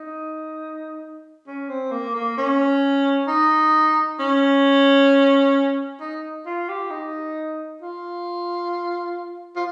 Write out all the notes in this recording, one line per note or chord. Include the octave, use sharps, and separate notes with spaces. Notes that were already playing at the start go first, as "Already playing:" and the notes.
Already playing: D#4
C#4
C4
A#3
A#3
C#4
D#4
C#4
D#4
F4
G4
D#4
F4
F4